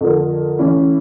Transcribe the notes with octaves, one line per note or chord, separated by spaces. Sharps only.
F2 D3 F3 A#3
E3 A3 C#4 E4